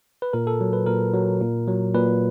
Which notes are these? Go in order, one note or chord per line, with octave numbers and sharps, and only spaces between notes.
B4
A#2 A#4
A4
F#3
B4
A#2 A#4
F#3
A#2
F#3
A#2 B4